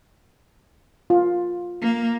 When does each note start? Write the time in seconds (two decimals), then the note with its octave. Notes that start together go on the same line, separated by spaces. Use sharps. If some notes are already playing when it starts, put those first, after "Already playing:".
1.10 F4
1.82 A#3